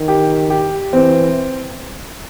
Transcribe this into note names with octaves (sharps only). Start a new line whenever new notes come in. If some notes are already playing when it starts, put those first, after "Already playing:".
Already playing: D#3
G4
G4
E3 C4